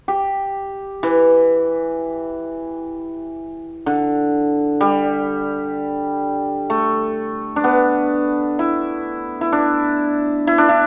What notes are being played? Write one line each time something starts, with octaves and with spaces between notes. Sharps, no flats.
G4
E3
D3
G3
A3
D4
B3
E4
E4
D4
E4
D4
E4